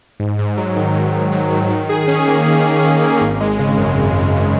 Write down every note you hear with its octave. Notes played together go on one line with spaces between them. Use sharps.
G#2
G#2
F#3
D#3
G#2
G#2
F#3
D#3
D#3
G#4
C#4
A#3
D#3
G#4
C#4
A#3
G#1
G#3
C#3
F#2
G#1
G#3
C#3